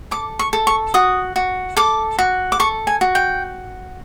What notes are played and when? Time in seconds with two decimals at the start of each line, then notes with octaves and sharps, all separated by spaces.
0.11 A4 D6
0.39 C#6
0.53 A4
0.67 C#6
0.94 F#4 D#6
1.36 F#4
1.77 A4 D6
2.19 F#4
2.52 D6
2.60 A4 C#6
2.87 G#5
3.01 F#4
3.15 G5